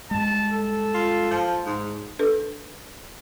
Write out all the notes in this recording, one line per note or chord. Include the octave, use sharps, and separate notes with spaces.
G2 G#3 A5
A4
F4
F3
G#2
D4 A4 B4